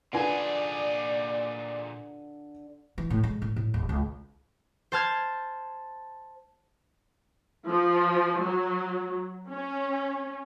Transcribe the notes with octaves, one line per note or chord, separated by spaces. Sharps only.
A#2 D3 F4 G#4 B4 D5 G#5
E3
A2
G#3
A2
A2
D1
C#2
C5 A5 F6 G#6
F3
F#3
C#4